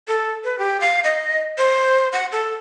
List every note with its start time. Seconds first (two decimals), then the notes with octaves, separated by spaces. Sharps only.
0.08 A4
0.44 B4
0.59 G4
0.81 F5
1.04 D#5
1.58 C5
2.13 F#5
2.32 A4